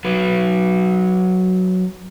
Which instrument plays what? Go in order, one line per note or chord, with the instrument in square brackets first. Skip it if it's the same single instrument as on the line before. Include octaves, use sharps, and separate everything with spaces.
[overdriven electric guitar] F#3 B4